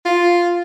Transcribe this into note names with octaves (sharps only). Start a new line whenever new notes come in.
F4